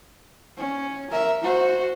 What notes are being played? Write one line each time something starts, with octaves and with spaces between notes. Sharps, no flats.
C#4
A#4 E5
F#4 C5